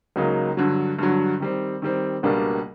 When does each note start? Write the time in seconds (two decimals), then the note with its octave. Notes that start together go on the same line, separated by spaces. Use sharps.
0.16 C#2 C#3 F#3 A#3 D#4
0.57 G2 D3 F#3
0.99 G2 D3 F#3
1.40 D#3 G3 C4
1.82 D#3 G3 C4
2.23 C#2 B2 G3 A#3 D4